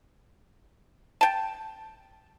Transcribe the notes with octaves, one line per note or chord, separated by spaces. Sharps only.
G5 A5